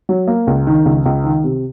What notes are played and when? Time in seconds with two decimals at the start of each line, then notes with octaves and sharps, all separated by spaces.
0.09 F#3
0.27 A#3
0.47 C#2
0.67 D#3
0.86 C#2
1.06 C#2
1.24 D#3
1.44 C3